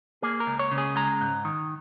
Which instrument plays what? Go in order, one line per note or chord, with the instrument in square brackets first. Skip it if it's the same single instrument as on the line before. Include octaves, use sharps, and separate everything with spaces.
[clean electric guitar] A#3 G#4
A#4
C#2
C#5
C#3
G#4
G#3 A#5
G#2
D#3